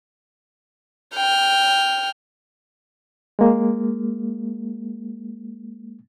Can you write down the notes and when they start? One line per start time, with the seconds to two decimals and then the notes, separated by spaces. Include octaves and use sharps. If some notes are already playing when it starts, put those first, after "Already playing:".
1.14 G5 F6
3.39 G#3 A#3